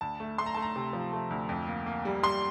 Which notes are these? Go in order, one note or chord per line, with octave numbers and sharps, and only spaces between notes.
D2 A5
A3
A3 C6
A#5
A3 A5
A#5
C3
F3
A3
D2
F2
A#3
A#3
G3
G3 C6